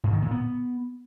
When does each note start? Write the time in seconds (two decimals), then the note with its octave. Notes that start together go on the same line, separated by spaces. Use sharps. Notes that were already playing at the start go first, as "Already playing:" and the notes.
0.04 G#2
0.13 D#3
0.22 A#2
0.31 B3